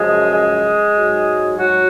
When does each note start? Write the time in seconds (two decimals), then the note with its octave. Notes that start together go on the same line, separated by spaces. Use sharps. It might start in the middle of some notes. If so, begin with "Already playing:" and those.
Already playing: F#2 C#3 F3 G#3 G#4
0.32 G#3 G#4
0.94 G#2 F#3
1.58 F#3 F#4